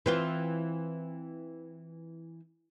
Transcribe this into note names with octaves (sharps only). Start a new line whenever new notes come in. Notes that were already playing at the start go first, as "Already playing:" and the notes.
E3 C4 F4